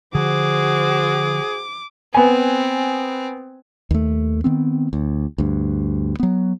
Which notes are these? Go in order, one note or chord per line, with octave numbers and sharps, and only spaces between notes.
D3 F3 F#4 G#4 C5 D6
B3 C4 G#5
D#2 A3
D#3 B3 C4
D2
D2 G2
F#3 B3